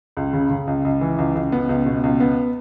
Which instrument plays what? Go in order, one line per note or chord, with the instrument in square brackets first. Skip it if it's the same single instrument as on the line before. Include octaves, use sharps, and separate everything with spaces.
[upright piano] C#2
C#3
C#3
C#2
C#2
E3
C#2
C#2
B3
C#2
B2
C#2
B3